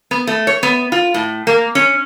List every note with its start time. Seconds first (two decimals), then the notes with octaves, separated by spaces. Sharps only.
0.11 B3
0.27 A3
0.47 C#5
0.63 B3
0.92 F4
1.14 A2
1.47 A#3
1.75 C#4